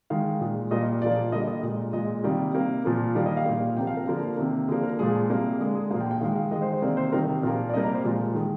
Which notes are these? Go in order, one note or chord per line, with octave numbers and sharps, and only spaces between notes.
D#3 G#3 F5
A#2 G#3
A#2 G3 A#3 D#5
A#2 F3 A#3 D5
D3 G3 A#3 D#5
D#5
A#2 G#3
A#2 G#3 D#5
C3 D#3 G3 A#3
C3 G3 A#3
A#2 F3 A#3
D#3 G3 A#3 F5
D#5
F5
A#2 G3 A#3
C3 F3 A#3 G5
F5
A#4
D3 F3 A#3
C3 D#3 A#3
D3 F3 A#3 G#4
A#4
A#2 F3 G#3 G#4
C3 G3 A#3
D3 G#3
G#4
A#2 F3 A#3 F5
G5
G5
D#3 G#3 F5
F5
D#3 G#3 D#5
C5
C5
C3 D#3 A#3 D5
C5
C3 D#3 G3 A#4
A#4
A#2 F3 A#3 A#4
D5
C3 G3 A#3 D#5
A#5
C5
A#2 F3 G#3
A#4
D#3 G#3 G#4